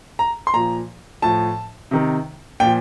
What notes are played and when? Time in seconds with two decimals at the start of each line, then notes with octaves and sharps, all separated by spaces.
0.19 A#5
0.47 C6
0.53 A#2 F3 A#5
1.22 A2 F3 A5
1.91 C3 D#3
2.60 A#2 F3 G5